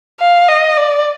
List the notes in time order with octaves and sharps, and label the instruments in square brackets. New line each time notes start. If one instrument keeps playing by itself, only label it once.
[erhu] F5
D#5
D5